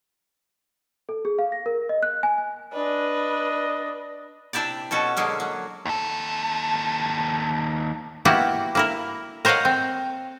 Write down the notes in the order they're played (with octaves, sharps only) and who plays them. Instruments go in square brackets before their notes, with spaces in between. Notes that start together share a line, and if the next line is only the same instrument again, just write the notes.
[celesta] A4
G#4
F5
A#6
A#4
D#5
F#6
G#5
G#5
[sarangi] D4 [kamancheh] B4 [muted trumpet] D#5
[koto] C3 D4 E4 G4 D5
B2 C#4 F#4 A4
D3 G#3 A#3 C#4
F#3
[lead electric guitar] D#2 A4
[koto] A#3 B3 E4 F#4 G4
A#3 E4 A#4
A#4 C5 C#5 D#5 F5 F#5
C4